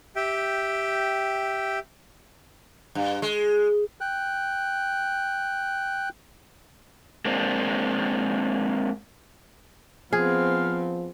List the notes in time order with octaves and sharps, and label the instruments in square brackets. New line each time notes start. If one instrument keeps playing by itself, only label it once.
[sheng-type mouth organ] G4 E5 G5
[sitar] G2
G#3
[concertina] G5 F#6
[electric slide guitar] G#3 A#3 C4 D4
[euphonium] F3 [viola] B3 C4 [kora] G#4 [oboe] F5